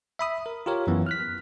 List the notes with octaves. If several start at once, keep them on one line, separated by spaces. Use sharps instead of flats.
E5 B5 D#6
A#4
F4 G4 A#4 C#5
F#2 E3 B3
F6 F#6 B6